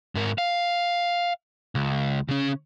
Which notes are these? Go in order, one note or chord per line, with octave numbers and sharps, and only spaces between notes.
G#2 A#4
F5
C#2
C#3 C#4